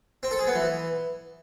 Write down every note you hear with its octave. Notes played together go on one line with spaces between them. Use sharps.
C4
A4
G#4
B3
E3